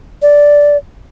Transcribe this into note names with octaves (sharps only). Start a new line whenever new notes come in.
D5